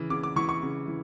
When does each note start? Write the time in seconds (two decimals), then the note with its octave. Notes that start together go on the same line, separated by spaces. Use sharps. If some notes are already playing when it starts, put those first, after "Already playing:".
Already playing: C#3 E3
0.10 C#3 D6
0.23 D6
0.36 E3 C#6
0.49 C#6
0.63 C#3
0.88 E3